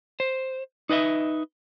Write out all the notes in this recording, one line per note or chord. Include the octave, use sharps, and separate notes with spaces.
C5
D#4 B4 D#5 E5